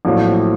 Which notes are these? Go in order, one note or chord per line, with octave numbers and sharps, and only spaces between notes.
A#1 A2 F#3 A3 C4